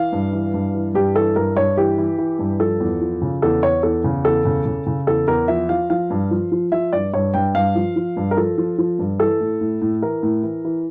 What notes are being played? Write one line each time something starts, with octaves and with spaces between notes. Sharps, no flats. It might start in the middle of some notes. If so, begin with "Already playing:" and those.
Already playing: E3 F5
G2
E3
G2
E3
G2 G4
E3 A4
G2 A#4
G2 C#5
E3 G4
E3
E3
G2
F3 A4
E2
F3
C#3
E2 A4
E2 C#5
E2 A4
C#3
E2 A4
C#3
C#3
C#3
E2 A4
E2 A#4
F3 E5
F3 F5
F3 F5
G2
F3
F3
F3 E5
G2 D5
G2 C#5
G2 G5
G2 F5
F3
F3
G2
A#4
F3 A4
F3
F3
G2
E3 A4
A2
A2
A2
E3 A#4
A2
E3
E3